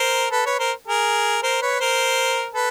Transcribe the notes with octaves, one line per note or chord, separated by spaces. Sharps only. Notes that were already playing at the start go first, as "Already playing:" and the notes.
Already playing: A#4 C5
A4 B4
B4 C#5
A#4 C5
G#4 A#4
A#4 C5
B4 C#5
A#4 C5
A4 B4